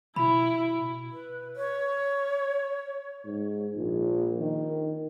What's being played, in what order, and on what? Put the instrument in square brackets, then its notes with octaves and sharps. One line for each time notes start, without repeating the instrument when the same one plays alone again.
[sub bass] B2 [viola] E4 [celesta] B5
[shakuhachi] B4
C#5
[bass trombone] G#2
A#1
D#3